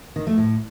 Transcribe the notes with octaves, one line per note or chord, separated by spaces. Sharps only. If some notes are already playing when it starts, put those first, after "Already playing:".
D#3
A3
A2